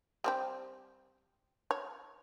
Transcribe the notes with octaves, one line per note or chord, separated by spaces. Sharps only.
G3 C4 G4
C#5